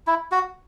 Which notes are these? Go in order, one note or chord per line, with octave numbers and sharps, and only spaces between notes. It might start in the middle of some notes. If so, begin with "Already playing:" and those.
E4
F#4